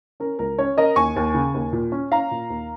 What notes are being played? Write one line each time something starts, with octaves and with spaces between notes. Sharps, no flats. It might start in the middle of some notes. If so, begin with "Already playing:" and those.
C#4 A#4
C#2 A#4
C#4 C#5
C#4 A#4 D#5
D#2 G#5 C#6
D#2
C#3
D#2
A#2
C#4
C#4 F5 A#5
A#2
D#2